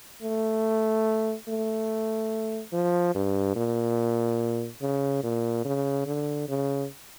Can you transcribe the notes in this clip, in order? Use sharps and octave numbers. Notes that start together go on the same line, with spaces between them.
A3
A3
F3
G2
A#2
C#3
A#2
C#3
D3
C#3